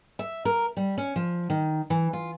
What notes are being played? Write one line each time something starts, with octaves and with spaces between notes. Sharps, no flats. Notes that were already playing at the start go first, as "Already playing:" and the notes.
E5
A#4
G3
C#4
F3
D#3
E3
F4